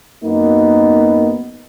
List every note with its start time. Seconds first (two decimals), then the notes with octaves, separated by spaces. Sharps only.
0.24 F#2 A#3 B3 D#4